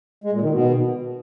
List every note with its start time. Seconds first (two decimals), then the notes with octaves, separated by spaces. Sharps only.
0.24 G#3
0.33 A#2
0.42 D#3
0.50 B2